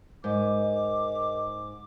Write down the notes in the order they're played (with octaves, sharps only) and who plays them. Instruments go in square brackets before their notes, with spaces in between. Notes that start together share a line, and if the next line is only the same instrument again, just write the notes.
[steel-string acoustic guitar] G#2 [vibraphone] A#4 D#5 [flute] D6